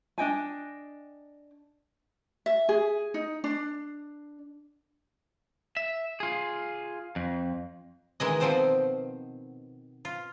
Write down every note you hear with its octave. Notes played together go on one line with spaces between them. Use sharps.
D4 D#5 G5 G#5
E5
G#4
D#4
D4
E5
F4 G#4
F2
D#3 E3 G#3 D#5
B2 D#3 F3 C4 C5 G5
F4